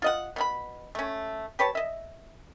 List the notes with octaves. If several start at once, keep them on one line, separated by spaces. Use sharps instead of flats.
F4 D#5 F#5
B2 C#4 B5
A3 C#4
G4 B4 C#5 A5
D#5 E5